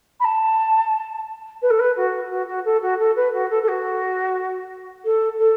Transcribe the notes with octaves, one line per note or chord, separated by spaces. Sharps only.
B5
A5
B4
A4
B4
F#4
F#4
F#4
A4
F#4
A4
B4
F#4
A4
A4
F#4
A4
A4